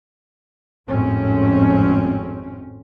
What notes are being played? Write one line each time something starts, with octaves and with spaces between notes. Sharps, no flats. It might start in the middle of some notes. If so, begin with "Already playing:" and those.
G#1 F2 A2 C4 C#4